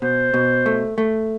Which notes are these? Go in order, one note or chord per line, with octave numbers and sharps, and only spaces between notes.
B2 C5
B2
A3
A3